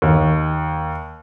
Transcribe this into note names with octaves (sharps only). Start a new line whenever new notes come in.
D#2